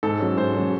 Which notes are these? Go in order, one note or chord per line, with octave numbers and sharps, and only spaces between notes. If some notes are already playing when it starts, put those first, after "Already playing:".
G#2 A4
F#3 C#4
G#2 C5
F#3 C#4